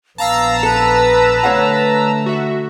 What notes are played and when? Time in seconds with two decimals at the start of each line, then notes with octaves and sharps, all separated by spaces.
0.18 A#1 B3 F5 A5 A#5 E6
0.63 A4 B4
1.43 D3 A3 C#5 F5 F#5
2.26 F#4 E5